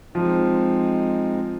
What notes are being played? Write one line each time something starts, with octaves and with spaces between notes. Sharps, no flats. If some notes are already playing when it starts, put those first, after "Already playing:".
F3 G#3 C4 D#4